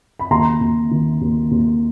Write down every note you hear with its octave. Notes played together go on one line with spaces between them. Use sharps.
B5
D#2 A#5 C6
D#2
D#3
D#2
D#2